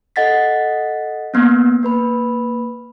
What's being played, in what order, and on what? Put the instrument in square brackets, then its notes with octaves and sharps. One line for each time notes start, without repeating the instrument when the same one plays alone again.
[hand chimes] A4 D#5 F#5 A6 B6
A#3 B3 C#4
A#3 B4 B5